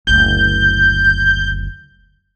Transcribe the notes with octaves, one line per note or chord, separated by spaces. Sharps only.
F#1 D2 G6